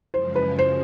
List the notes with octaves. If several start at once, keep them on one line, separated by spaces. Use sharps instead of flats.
F#2 C#3 F3 G#3 C5
B4
C5